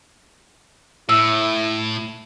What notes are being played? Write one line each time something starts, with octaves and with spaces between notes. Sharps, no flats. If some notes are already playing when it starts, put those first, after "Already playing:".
A2 E4 E6